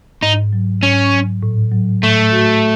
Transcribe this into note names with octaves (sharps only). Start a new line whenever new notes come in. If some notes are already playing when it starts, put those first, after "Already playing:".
G#2 D#4
F#3
G#2 C#4
F#3
A2
F#3
A2 A3
F#4